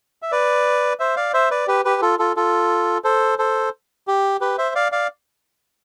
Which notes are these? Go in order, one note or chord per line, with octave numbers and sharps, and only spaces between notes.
E5
B4 D5
C5 E5
D5 F5
C5 E5
B4 D5
G4 B4
G4 B4
F4 A4
F4 A4
F4 A4
A4 C5
A4 C5
G4
G4 B4
C5 E5
D5 F5
D5 F5